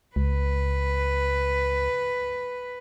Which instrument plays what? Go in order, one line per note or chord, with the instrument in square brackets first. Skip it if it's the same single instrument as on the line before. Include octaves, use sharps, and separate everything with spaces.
[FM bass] C#2 [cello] B4